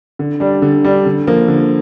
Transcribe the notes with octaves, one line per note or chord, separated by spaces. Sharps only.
D3
G3 D4
D3
G3 D4
D3
F3 A#3
D3